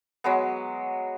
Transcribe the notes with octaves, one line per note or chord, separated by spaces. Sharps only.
F#3 G#3 B3